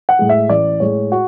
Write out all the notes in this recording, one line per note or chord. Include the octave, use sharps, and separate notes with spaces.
F#5
A2 G#3
E5
A1 D5
A2 G#3 C#5
F#4